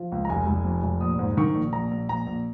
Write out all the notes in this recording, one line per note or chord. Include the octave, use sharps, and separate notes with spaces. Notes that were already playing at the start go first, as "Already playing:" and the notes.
Already playing: F3
C#2
A#5
F1 G#5
F1
F2
F1
A#1 D#6
G#2
D#3 C#6
A#1
A#1 A#5
A#1
A#1 A#5
A#1